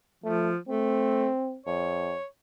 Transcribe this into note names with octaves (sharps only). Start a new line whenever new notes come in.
F3 A3
A3 C4
F2 C#5